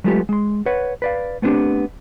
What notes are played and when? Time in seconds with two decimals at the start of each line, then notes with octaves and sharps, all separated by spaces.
0.04 F#3 G#3 A3 B3 F4 G4
0.29 G#3 C6
0.66 B4 C#5 F#5
1.02 B4 D5 F5
1.42 A3 B3 C4 D4 G4